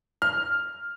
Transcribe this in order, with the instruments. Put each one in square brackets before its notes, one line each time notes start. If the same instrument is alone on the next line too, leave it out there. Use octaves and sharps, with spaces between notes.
[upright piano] F6